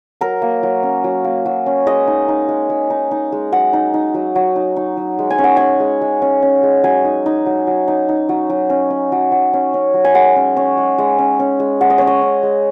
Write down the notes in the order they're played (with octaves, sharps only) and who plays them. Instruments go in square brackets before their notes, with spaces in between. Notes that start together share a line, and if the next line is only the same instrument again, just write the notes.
[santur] F#3 A#4
A#3
F#3
C#4
F#3
A#3
F#3
C#4
G#3 D#5
D#4
D#4
G#3
G#3
D#4
D#4
G#3
F#3 F#5
D#4
D#4
F#3
F#3
D#4
D#4
F#3
G#3
G#5
C#4
F#5
C#4 G#5
G#3
G#3
C#4
C#4
G#3
F#3 G#5
D#4
D#4
F#3
F#3
D#4
D#4
F#3
F#3
C#4
C#4
F#3
F#3
C#4
C#4
F#3
G#5
G#3 F#5
C#4
C#4
G#3
G#3
C#4
C#4
G#3
G#3 F#5
D#5
C#4 C#5
D#5
C#4
G#3